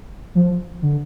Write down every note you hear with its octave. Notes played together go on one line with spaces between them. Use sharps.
F3
D3